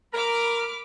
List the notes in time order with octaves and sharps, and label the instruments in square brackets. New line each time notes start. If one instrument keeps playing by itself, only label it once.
[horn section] A#4 [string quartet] B5 D6 F6